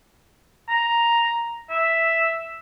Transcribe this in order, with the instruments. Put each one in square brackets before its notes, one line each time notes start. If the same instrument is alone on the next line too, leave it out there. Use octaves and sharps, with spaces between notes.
[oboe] A#5
E5